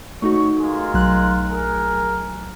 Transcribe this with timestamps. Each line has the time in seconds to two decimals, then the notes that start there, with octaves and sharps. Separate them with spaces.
0.22 A3 D#4 F#4 C#5 C#6
0.58 G#3 F4 A#4
0.94 B1 F#3 F#6
1.49 G#4 A#4